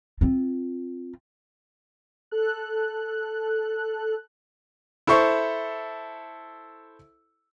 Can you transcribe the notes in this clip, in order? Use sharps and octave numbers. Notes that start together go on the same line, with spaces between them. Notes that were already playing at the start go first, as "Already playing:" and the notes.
C4 F4
A4 F#6
E4 A4 C5 C#6